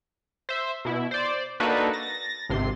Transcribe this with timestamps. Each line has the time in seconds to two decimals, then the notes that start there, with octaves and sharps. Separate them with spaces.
0.49 C5 E5
0.85 B2 E4
1.11 C5 D5
1.60 A#3 D4 D#4 F#4 A4 B4
1.93 A6 A#6
2.49 G#1 C3 C6